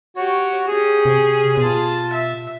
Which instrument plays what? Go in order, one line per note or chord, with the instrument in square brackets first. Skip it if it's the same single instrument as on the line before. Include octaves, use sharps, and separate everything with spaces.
[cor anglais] F#4 [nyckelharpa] G4 C#5
[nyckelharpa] C#4 G4 [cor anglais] G#4
[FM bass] C3
[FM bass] B2 [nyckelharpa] F4 A5
[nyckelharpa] E5